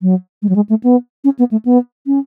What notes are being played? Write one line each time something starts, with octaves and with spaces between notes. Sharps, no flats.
F#3
G#3
F#3
G#3
A3
B3
C#4
B3
A3
B3
C#4